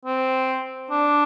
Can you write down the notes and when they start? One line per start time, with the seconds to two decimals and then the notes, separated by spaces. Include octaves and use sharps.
0.05 C4
0.91 D4